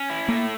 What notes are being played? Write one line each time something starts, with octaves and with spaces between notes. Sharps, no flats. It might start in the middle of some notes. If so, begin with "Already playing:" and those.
Already playing: C#4
E4
A3 A#3